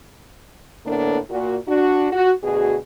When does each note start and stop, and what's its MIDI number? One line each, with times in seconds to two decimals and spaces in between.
0.86 1.18 45
0.86 1.18 50
0.86 1.18 58
0.86 1.18 59
0.86 1.18 62
0.86 1.18 69
1.30 1.56 46
1.30 1.56 66
1.68 2.10 62
1.68 2.10 66
2.12 2.31 66
2.43 2.76 38
2.43 2.76 47
2.43 2.76 66
2.43 2.76 68